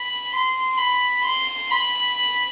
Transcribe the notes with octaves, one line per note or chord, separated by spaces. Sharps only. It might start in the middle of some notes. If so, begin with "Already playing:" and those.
Already playing: B5
C6
B5
C6
B5